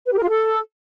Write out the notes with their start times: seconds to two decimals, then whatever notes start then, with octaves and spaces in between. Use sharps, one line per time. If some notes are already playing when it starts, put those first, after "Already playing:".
0.06 B4
0.12 G4
0.17 A#4
0.23 F4
0.29 A4